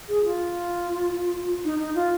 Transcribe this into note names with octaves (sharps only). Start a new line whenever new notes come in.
G#4
F4
D#4
D#4
F4